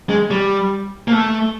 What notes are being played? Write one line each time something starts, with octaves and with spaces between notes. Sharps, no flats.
G#3
G3
A#3
A3